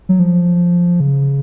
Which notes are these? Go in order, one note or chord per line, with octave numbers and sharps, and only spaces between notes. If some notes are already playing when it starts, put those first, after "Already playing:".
F#3
F3
C#3